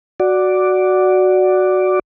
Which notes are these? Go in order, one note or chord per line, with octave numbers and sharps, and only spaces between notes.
F#4 D5